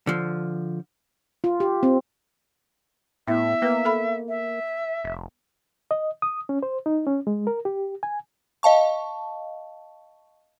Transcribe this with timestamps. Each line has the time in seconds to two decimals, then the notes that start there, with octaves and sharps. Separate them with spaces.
0.07 D3 F3
1.44 F4
1.60 G4
1.83 C4
3.27 A2 B3 E4 E5
3.62 A#3 B3 B4
3.85 A4 F5 B5
4.28 E5
5.04 F1
5.91 D#5
6.22 D#6
6.49 C#4
6.63 C5
6.86 D#4
7.07 C#4
7.27 G#3
7.47 A#4
7.65 G4
8.03 G#5
8.63 D#5 F5 A5 C#6